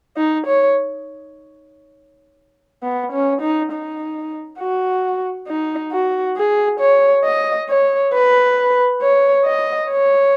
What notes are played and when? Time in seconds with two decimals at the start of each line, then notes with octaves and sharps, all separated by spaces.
0.17 D#4
0.47 C#5
2.83 B3
3.12 C#4
3.42 D#4
3.72 D#4
4.59 F#4
5.48 D#4
5.92 F#4
6.37 G#4
6.80 C#5
7.25 D#5
7.69 C#5
8.14 B4
9.02 C#5
9.46 D#5
9.91 C#5